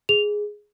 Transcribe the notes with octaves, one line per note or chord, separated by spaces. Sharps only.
G#4 F7